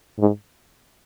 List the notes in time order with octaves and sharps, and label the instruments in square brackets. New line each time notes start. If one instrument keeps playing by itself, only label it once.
[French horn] G#2